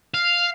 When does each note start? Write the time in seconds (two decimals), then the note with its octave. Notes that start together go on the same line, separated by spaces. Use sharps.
0.14 F5